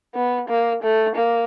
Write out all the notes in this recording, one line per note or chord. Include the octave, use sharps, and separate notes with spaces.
B3
A#3
A3
A#3